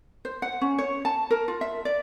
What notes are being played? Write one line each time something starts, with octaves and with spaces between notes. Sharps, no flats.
C5
F#5
C#4
C#5
A5
A#4
F4
E5
D5